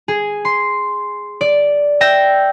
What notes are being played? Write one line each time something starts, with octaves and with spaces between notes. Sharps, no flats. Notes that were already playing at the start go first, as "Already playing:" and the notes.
G#4
C6
D5
E5 G5 A#6 E7